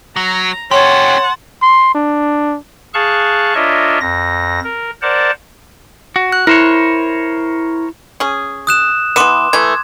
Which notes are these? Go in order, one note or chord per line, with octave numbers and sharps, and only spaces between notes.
F#3 A#5
C#4 G4 C#5 F#5 A5 C6
C6
D4
G#4 F5 A5 C#6 F#6
D4 F4 A#4 C#5 D#5 E5
F2 A#6
A#4
A#4 C5 D5 F#5 A5
F#4
F#6
E4 A#4 C5 C#5
C#4 G#4
D#6 F#6 E7
E3 B3 C6 D6 E7
E3 A3 G#6